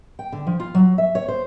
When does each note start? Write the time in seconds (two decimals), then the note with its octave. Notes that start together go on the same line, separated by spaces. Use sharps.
0.19 G5
0.32 D3
0.47 F3
0.60 F4
0.75 F#3
0.98 E5
1.15 C#5
1.28 C5